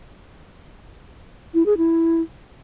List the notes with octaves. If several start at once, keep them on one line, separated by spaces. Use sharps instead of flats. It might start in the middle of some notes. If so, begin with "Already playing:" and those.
E4
G#4
E4